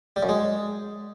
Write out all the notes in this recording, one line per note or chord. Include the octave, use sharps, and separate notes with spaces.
G3
F#2
G#3